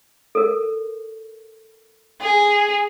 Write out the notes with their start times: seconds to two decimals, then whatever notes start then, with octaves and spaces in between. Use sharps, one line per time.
0.35 A4 A#4
2.21 G#4